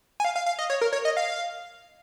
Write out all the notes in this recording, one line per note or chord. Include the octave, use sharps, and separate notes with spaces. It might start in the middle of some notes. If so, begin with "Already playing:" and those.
G#5
F5
F5
F5
D#5
C#5
A#4
C#5
D#5
F5